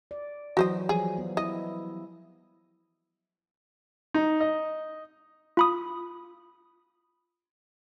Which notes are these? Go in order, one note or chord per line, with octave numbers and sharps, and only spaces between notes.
D5
E3 F#3 F#4 C5 D#5
F3 G3 G#4
B3
E4 D#5
D#4
D#5
F4 B5 D#6